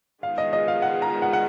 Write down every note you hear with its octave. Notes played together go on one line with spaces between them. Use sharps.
D#3 G#3 B3 F4 G#4 F5
D#5
D#5
F5
F#5
A#5
F#5
F#5